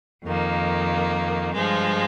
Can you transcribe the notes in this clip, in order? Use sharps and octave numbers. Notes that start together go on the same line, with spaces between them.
F2 D#3 A#3
G2 F3 G#3